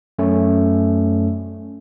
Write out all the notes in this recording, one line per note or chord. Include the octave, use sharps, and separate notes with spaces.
F#2 A3 C#4